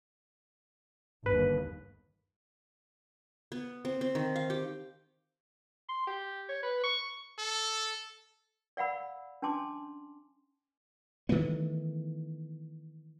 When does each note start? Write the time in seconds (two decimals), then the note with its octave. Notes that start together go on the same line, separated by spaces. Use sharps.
1.26 G1 D#2 B4
3.52 B3
3.85 C4
4.01 C4
4.15 D#3
4.36 F5
4.50 G4
5.88 C6
6.07 G4
6.49 C#5
6.63 B4
6.83 C#6
7.39 A4
8.77 D5 F5 F#5 B5 E6
9.42 C#4 D4 G#5 A5 C6 D6
11.29 D#3 E3 A3 B3